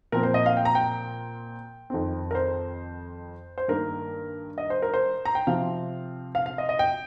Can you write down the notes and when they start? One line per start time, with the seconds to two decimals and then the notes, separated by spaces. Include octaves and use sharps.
0.12 A#2 F3 C4 A#4
0.23 C5
0.34 D#5
0.46 F5
0.57 G5
0.65 A#5
0.75 G5
1.90 F2 D#3 C4
2.31 A#4
2.35 C5
3.58 C5
3.68 G2 D#3 A#3 A#4
4.58 D#5
4.70 C5
4.82 A#4
4.94 C5
5.25 A#5
5.35 G5
5.47 C3 F3 C4 F5
6.35 F5
6.46 F5
6.58 D#5
6.69 D#5
6.79 G5